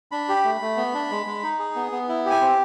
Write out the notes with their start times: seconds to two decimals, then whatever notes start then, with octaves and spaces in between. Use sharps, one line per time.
0.12 D4 B5
0.29 G4
0.45 A3
0.61 A3
0.77 B3
0.94 D4
1.11 G#3
1.26 G#3
1.43 D#4
1.59 G#4
1.75 B3
1.92 B3
2.09 E4
2.25 G4
2.30 G#5
2.41 C4